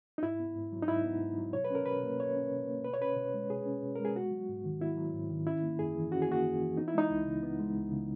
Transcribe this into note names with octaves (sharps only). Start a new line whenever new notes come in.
D#4
G#2 E4
B3
G#2
F#3
D#4
G#2 E4
B3
G#2
F#3
B2 C#5
B4
C#4 A#4
B2 B4
A#3
B2 C#5
C#4
B2
A#3
B2 B4
C#5
C#4 B4
B2
G#3
B2 G#4
C#4
B2
G#3 A#4
G#4
B3 F#4
F#3
G#2
D#3
B3 E4
F#3
G#2
D#3
C#4 E4
A#3
F#2 G#4
E3
C#4 F#4
G#4
A#3 F#4
F#2
E3
B3 D#4
E4
G#3 D#4
C#2
C#3
B3
G#3
C#2
C#3